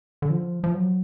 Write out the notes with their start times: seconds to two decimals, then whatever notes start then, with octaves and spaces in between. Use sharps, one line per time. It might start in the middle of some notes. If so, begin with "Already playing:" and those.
0.22 D3
0.30 F3
0.64 F3
0.74 F#3